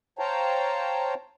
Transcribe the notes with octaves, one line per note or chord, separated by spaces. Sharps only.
C5 C#5 F5 G5 A5 A#5